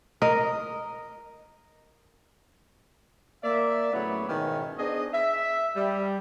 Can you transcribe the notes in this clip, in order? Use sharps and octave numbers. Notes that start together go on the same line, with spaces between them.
A#4 D#5
A#3 D5 E5
A2 C#3 F#3 B3 C#5 B5
G#2 B2 D#3 E3 C#4
B3 D4 G#4 C5 D#5
E5
G3